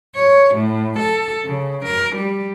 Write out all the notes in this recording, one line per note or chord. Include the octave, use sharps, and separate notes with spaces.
C#5
A2
A4
C#3
A#4
G3